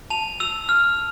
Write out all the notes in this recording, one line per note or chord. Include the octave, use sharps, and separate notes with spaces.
A5 F7
E6 F7
F6